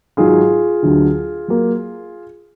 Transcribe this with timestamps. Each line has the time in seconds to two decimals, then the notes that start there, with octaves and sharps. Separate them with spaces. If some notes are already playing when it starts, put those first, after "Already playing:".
0.17 G#2 D#3 F#3 F4 G#4
0.82 D2 D3 F#3
1.48 F#3 A#3